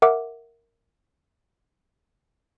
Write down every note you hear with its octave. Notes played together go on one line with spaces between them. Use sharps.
A#4 E5 F#5 D6